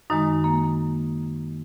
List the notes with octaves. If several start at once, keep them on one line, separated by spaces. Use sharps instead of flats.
F#2 D#3 G#3 D#4
A#3